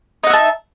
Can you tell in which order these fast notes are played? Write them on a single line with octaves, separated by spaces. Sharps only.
D#4 F#5 E5 A5